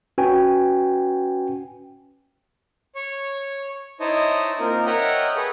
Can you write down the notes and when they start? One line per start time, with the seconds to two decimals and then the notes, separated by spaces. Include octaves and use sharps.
0.18 C#4 F#4 B4 G5 G#5
2.95 C#5 C#6
4.00 D#4 E4 C5 C#5 D#5 A5
4.60 A#3 C4 D#4 F4 A#4
4.86 A#4 C#5 D#5 E5 F#5 G5
5.36 G#4 A4 B4 C#6